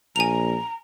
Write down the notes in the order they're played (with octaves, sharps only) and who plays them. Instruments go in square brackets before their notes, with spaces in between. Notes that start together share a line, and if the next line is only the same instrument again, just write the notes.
[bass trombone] A#1 [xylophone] G#5 F7 [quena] A#5